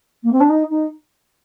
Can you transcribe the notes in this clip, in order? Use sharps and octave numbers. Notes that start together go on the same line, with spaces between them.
A#3
C4
D4
D#4
D#4